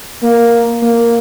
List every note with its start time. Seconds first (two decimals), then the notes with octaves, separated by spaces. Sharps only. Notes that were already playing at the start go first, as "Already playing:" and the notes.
0.23 A#3
0.82 A#3